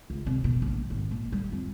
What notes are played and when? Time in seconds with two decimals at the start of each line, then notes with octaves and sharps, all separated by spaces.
0.10 C#2
0.26 C3
0.44 B2
0.62 A#1
0.90 G#1
1.11 A#2
1.32 G3
1.52 F2